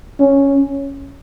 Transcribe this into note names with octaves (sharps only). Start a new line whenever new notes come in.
C#4